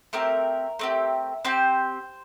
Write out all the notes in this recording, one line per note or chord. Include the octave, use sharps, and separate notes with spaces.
A3 C4 G4 A#4
A3 C4 G4
C4 G4 C5